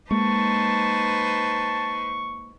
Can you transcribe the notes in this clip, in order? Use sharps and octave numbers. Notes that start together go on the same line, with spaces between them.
G#3 A#3 D#4 B4 C5 A5 C#6